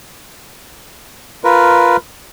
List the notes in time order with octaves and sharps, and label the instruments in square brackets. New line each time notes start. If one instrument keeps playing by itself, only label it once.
[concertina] F4 A#4 B4